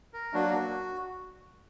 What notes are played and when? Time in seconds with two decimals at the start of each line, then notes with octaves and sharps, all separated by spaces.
0.13 A#4
0.33 F#3 A#3 D4 F#4